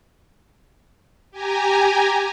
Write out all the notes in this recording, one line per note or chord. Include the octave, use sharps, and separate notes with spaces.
G4 G#5 A#5